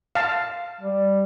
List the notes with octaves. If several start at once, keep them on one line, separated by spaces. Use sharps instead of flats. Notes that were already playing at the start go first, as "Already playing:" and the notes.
F5 A5
G3